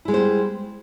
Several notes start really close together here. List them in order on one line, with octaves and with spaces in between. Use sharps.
E4 G#3 B3 C5 G3